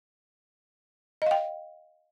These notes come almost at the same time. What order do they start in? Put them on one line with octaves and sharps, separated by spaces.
D#5 F5 G5